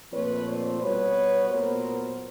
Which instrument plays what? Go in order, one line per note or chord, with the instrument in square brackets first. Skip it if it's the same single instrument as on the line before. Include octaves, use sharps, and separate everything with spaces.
[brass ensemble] A#2 F3 A3 C4 B4 C#5
C5 D5
B2 G3 B3 B4 C#5
A#2 F#3 B3 A#4 C5